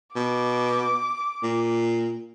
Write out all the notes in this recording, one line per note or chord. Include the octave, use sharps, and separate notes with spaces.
B2 D6
A#2